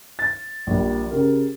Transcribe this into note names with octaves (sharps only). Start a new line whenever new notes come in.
A6
A#1 G3
C#3 G4 A#4